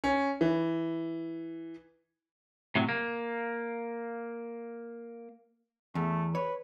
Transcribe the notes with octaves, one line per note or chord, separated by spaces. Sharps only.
C#4
E3
A2 C3 F#3
A#3
E2 A3
B4 C#5